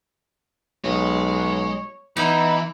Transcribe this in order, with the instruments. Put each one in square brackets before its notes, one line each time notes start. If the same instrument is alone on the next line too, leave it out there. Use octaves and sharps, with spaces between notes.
[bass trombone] B1 [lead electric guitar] G#3 [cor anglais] C#5
[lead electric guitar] E3 [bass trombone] B3 [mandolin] D#4 [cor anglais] E4